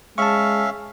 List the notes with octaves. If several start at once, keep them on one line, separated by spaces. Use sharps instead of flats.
G#3 C#4 E5 F5 A5 C#6